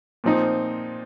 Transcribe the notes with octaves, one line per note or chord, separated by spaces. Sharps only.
A#2 F3 C4 D#4